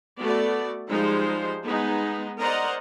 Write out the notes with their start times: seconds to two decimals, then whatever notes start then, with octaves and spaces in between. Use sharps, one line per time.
0.21 A3 B3 F#4 D5
0.90 F3 G3 G#3 D#4 C5
1.66 G#3 B3 D#4
2.41 A#4 C5 D5 D#5 F#5 A#5